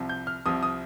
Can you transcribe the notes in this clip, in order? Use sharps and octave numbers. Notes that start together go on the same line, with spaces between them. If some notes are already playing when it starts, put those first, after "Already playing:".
Already playing: C2 C3 F3
G6
F6
C2 C3 F3 D#6
D#6